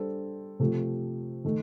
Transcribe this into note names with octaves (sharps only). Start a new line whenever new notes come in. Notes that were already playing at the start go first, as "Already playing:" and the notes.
Already playing: G3 D4 A4 C5
C3 F3 A3
D#3 A3